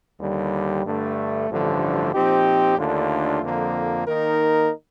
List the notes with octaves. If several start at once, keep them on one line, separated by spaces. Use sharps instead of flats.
D#2 D3 G3
G2 D3 A3
A1 G2 D3 F3 A3
A#2 F3 C4 D#4 G4
D#2 D3 A3 D4 F4
F2 D3 F3 A#3
D#3 A#3 D#4 A#4